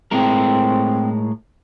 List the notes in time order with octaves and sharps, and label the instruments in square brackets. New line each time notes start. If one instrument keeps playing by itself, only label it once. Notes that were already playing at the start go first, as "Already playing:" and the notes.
[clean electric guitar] A2 G#3 A#4 [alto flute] C4